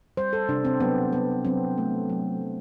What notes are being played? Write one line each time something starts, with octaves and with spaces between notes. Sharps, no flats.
G3 C5
A4
C3 D4
C4
F#3 B3
F#3 B3
F#3 C4
A3
F#3
F#3